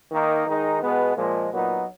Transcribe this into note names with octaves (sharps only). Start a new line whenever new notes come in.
D#3 A#3 D#4
D#3 G#3 D#4
B2 G#3 B3
A#2 F3 G#3
A#2 F#3 B3 D#4